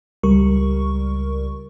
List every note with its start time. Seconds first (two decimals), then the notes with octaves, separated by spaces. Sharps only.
0.23 C#2 G3 A#4 C#6